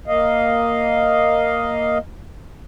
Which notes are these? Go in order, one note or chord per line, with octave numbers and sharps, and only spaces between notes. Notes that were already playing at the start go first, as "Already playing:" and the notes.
A#3 D#5 F5